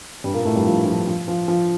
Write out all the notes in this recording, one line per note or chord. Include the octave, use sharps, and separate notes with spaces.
G2 G3
A#2 A#3
A2 A3
G2 G3
F3
F3
F3
F3
F3